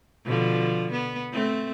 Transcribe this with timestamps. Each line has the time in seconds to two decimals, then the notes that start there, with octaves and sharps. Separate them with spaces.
0.25 B2 D3 F3
0.92 B3
1.32 A3 C4